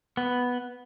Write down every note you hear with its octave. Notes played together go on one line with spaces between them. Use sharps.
B3